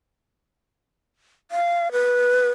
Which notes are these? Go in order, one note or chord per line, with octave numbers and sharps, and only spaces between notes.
F5
B4